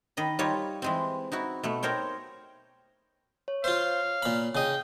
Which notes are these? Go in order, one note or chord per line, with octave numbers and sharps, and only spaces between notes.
D#3 D#5 B5
G3 D#4 F4 C#5
E3 G#3 C4
D#4 E4 F#4
B2 A3 B3
D#4 A#4 C5 C#5 G5
C#5
F4 C5 F5
A#2 B5
C#3 D#5 G5